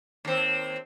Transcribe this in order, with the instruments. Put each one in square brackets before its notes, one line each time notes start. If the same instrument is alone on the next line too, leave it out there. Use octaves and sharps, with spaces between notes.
[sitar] D#2 C4